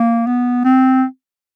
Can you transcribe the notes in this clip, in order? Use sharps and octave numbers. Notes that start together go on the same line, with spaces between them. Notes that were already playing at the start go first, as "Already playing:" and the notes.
Already playing: A#3
B3
C4